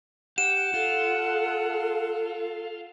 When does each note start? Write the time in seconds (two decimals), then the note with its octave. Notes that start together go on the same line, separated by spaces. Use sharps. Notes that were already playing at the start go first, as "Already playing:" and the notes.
0.38 G4 F#5 E7
0.74 F4 A4